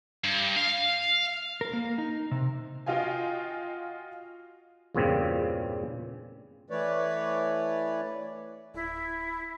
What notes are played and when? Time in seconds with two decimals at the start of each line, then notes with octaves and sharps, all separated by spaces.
0.24 G2
0.57 F5
1.61 A#4
1.73 A#3
1.98 D#4
2.31 C3
2.86 F4 F#4 D#5 F5 G5 G#5
4.94 E2 G2 A#2 C#3 C4
6.70 E3 A3 B4 C#5 D5
8.74 D1 E4